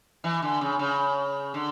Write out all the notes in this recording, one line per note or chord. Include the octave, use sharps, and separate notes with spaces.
E3
D3
C#3
C#3
D3